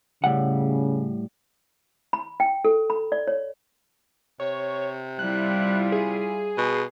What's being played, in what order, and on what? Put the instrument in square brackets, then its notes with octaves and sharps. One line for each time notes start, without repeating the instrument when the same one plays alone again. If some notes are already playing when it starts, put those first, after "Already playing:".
[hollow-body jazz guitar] A2 G3 F#5 [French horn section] C#3
[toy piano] B5
G5
A4
B5
D5
C#5
[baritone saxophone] C3 [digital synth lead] C#5
[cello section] G3 E4 F4 [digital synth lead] F#6
[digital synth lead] G#4
[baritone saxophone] B2